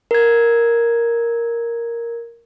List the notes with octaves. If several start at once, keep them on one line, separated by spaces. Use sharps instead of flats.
A#4 G#6